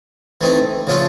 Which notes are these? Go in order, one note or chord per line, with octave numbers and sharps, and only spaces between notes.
E3 A3 C4 D#4
C#3 F3 A3 D4 F4